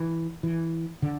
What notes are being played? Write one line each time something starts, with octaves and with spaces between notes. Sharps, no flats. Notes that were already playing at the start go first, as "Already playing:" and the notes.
Already playing: E3
E3
D3